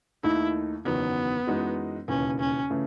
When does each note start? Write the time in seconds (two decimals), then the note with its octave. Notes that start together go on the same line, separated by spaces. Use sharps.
0.23 D#2 D#3 A3 D#4 E4
0.85 F#1 E2 D#3 F#3 B3
1.47 F#2 E3 G#3 D#4 F#4
2.08 E1 D#2 C#3 E3 C#4
2.40 C#4
2.70 C#3 E3 A3